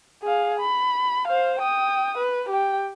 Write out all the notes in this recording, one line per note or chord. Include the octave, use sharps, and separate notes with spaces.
G#4 F5
B5
C5 F5
G5 D#6
B4
G4 G5